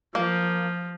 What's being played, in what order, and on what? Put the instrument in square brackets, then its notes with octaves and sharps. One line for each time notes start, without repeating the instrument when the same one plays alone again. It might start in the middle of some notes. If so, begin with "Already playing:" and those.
[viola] F3 [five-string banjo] A#3